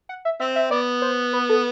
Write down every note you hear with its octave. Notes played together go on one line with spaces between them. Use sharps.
F#5
E5
C4 E5
E5
B3 D5
C5
B4
A4